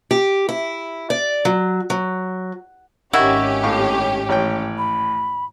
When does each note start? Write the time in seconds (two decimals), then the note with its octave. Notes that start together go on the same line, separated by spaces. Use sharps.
0.11 G4
0.49 E4
1.10 D5
1.45 F#3
1.90 F#3
3.13 G#1 D#3 C#4 E4 F#4 G4
3.63 A2 F5 C#6
4.29 A1 C#5 G5
4.78 B5